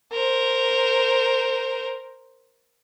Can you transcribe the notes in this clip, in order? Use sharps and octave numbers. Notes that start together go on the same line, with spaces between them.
A#4 C5